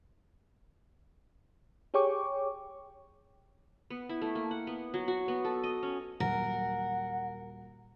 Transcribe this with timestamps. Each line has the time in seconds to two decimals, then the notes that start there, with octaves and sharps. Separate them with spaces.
1.94 G4 G#4 C#5 G5 C#6 D6
3.90 B3
4.09 E4
4.22 A3
4.35 A#3
4.51 F#5
4.67 B3
4.94 F#3
5.08 F#4
5.28 B3
5.45 A4
5.64 D#5
5.83 C#4
6.20 D#1 F#3 A#4 F#5